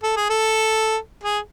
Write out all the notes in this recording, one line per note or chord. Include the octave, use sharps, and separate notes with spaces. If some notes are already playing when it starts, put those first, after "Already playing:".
A4
G#4
A4
G#4